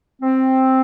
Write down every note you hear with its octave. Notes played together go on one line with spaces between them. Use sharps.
C4